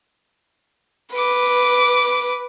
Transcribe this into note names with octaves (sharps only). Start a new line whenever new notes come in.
B4 D6